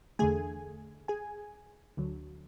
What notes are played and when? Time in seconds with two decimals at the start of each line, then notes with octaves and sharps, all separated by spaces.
0.19 E2 D3 A3 G#4 G#5
1.08 G#4 G#5
1.97 D2 D3 F#3